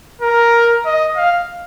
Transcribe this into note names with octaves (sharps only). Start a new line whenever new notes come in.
A#4
D#5
F5